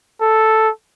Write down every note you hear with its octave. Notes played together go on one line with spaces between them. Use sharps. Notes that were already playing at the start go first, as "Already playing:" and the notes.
A4